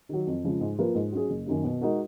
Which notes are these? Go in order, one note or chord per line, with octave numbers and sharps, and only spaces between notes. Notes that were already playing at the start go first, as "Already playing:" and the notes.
D#3 F#3
F2
C#3 F3 G#3
G#2
F3 A#3 F4 B4
G#2
F#3 C#4 G#4
F#1
F#2 D#3 A#3
B2
G#3 D#4 F#4 A#4